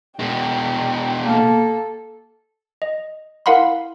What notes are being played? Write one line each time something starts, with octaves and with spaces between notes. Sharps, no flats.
B2 G#3 G5
A#3 A4
D#5
E4 A#4 F5 F#5 B5 C6